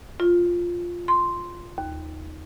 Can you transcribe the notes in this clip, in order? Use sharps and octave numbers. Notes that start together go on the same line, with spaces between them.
F4
C6
D#2